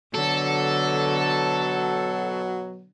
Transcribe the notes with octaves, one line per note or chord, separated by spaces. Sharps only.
B2 D3 F#3 A4